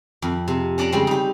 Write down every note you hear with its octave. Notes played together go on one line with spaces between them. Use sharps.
F2
C3
C#4 D4 D5 A5 A#5
C#3 G3 G#3 C4
D#4 G4